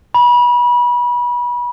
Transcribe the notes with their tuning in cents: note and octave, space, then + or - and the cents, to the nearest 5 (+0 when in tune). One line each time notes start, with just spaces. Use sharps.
B5 -30